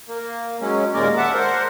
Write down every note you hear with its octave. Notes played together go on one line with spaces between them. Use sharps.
A#3
F#3 G#3 C#4
D#2 A#2 G#3 A#3 A#4 D5
E5 F#5 A5 D6
A#4 C5 F#5